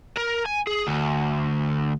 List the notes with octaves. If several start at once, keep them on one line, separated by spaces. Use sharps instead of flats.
A#4
G#5
G#4
D2